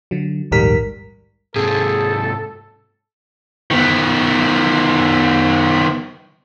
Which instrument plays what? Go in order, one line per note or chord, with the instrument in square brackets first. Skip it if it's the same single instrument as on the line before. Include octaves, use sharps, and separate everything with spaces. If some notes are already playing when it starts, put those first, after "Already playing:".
[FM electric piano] D3 F#3
A#1 D#2 G#2 G3 A#4 B6
[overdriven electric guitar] G#2 C3 [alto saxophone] G#4 [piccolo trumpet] A4
[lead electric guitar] D#3 B3